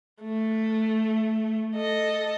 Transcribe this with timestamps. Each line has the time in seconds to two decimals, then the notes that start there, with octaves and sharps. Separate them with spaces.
0.21 A3
1.76 A4 D#5